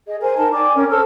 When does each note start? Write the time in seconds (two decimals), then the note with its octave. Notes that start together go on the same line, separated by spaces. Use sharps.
0.06 G#4 D#5
0.21 A#4 C5 G#5
0.37 D#4 A#4 A5
0.52 D5 G5 G#5 D6
0.75 C#4 A#4 G5
0.90 A4 C5 E6 F6